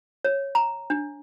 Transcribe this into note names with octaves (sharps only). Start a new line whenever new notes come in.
C#5
A#5
D4